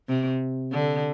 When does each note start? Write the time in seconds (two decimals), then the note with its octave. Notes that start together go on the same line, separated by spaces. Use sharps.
0.08 C3
0.72 D3